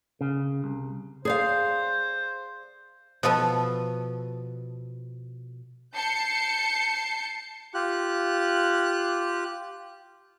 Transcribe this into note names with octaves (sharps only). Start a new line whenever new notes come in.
C#3
C2
G#4 C5 D5 F5
B2 F3 B3 A4
A5 G6 C7 C#7
F4 G4 F#6